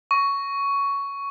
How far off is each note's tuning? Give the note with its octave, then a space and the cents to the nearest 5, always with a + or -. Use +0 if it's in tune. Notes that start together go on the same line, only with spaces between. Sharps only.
C#6 +10